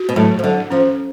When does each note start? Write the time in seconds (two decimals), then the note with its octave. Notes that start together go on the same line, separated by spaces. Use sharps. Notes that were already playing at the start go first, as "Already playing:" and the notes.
Already playing: F#4
0.09 B2
0.16 A2 F#3
0.39 F3
0.43 D3 F#3
0.70 F3 C#4